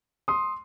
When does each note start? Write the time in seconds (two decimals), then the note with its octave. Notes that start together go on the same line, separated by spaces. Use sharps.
0.28 C6 D#6